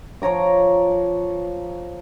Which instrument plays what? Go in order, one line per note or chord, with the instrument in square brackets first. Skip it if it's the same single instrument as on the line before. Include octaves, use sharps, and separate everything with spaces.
[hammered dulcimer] F3 C#5 A#5 D6